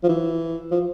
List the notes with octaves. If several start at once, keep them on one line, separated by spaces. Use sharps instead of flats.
F3
E3
F3